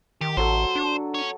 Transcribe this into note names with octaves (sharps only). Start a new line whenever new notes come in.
D#3 G4
A1 F#3 A4 C5
D4
C#4 C#5